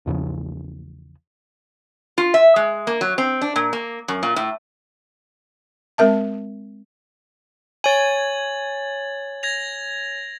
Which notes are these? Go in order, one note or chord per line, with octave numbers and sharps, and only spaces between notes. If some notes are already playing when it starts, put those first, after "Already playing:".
A#1 E2 C#3 F3
F4
E5
G#3
A#3
F#3
C4
D4
A#2
A#3
F#2
A#2
A2
G#3 C4 A#4 E5 A5
C#5 G#5 G#6 A6 F#7
G#6 A#6 F7